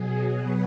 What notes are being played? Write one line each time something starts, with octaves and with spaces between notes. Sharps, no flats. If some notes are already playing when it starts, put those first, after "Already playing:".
Already playing: B2 F#3 G#4
F#4 B4